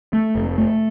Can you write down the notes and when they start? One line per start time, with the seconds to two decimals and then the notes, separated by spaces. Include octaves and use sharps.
0.13 A3
0.35 F1
0.58 A3